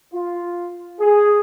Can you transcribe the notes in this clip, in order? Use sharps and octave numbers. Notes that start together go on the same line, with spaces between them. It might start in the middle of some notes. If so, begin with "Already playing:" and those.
F4
G#4